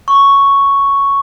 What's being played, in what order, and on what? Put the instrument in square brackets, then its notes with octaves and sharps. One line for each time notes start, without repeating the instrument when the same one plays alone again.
[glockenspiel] C#6